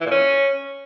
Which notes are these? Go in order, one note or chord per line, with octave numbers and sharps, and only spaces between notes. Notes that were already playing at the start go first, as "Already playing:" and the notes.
E3
A#2
C#4